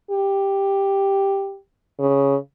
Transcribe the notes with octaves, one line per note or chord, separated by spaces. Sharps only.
G4
C#3